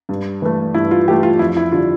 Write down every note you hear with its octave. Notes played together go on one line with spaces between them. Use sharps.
G2
E3 A3
G2 E4
F4
E3 A3 G4
F4
F2 E4
E4
D3 G3 F4